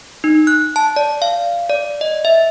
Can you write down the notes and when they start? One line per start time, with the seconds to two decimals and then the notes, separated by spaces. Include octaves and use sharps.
0.24 D#4
0.47 F#6
0.76 A5
0.96 D5
1.22 F5
1.70 D5
2.01 D#5
2.25 E5